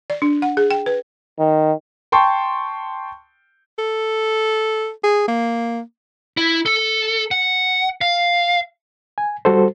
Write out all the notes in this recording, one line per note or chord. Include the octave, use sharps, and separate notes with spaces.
D5
D4
F#5
G#4
G5
B4
D#3
G5 A5 C6 C#6
A4
G#4
A#3
E4
A4
F#5
F5
G#5
G3 F#4 A4 C5